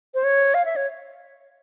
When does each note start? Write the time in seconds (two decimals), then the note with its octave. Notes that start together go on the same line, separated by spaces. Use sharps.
0.14 C5
0.24 C#5
0.54 F5
0.65 E5
0.76 C#5